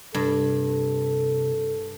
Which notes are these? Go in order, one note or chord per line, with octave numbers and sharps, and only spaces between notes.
G2 C3 A4